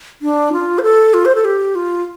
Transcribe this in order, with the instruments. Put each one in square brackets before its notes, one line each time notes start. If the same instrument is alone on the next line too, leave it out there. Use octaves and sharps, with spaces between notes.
[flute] D4
F4
C5
A4
F4
C5
A4
G4
F4